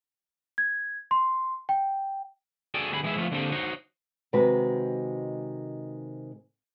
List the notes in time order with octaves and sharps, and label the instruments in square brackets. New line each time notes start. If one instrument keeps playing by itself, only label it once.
[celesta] G#6
C6
G5
[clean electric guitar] F#4 G#4 A4 D5 G5
D2 D3 G4 G#4 B5
E3 G#3 E4 G#4 E5
F3 A3 B3 F4
D3 A#3 C4 G4 A4 C5
D#4 F#4 C5 C#5
[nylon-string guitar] C3 D#3 G#3 F#4 B4